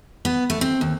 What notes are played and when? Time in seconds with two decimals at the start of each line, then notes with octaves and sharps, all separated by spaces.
0.25 B3
0.50 A3
0.61 C4
0.81 D#2